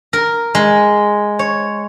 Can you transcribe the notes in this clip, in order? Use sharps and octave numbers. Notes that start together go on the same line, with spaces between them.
A#4
G#3
C#5